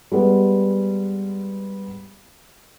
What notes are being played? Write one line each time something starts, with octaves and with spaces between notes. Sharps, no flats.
G3 G#3 B3